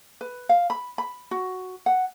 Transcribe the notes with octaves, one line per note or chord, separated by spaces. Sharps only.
B4
F5
B5
B5
F#4
F#5